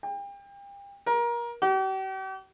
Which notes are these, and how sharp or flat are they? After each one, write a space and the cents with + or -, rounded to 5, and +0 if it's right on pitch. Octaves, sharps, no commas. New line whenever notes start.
G5 +35
A#4 +25
G4 -45